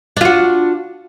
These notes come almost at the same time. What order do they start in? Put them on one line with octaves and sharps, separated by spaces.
D4 F4 F#4